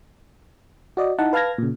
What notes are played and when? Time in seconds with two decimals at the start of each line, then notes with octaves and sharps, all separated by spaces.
0.97 F#4 D5 D#5
1.18 D#4 E4 F#5 A5
1.33 B4 F5 A5 F6 G#6 A#6
1.58 A#2 C#3